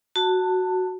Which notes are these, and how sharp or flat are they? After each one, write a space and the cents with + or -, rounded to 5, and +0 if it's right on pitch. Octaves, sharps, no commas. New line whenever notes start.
F#4 +0 A5 +20